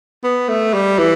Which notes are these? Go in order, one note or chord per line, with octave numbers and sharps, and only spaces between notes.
B3
A3
G3
E3